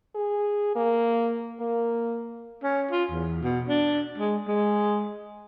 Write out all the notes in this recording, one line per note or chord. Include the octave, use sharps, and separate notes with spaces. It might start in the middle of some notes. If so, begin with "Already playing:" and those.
G#4
A#3
A#3
C#4
F4
E2
B2
D4
G#3
G#3